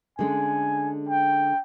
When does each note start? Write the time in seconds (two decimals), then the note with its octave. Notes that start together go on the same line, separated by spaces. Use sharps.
0.19 D3 G#3 C#4 G#5
1.09 G5